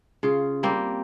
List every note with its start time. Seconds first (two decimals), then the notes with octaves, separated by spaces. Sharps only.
0.23 C#3 F4
0.63 G3 A#3 C4